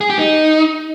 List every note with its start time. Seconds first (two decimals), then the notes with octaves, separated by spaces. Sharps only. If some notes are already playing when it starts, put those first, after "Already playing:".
0.01 G#4
0.10 G4
0.19 D#4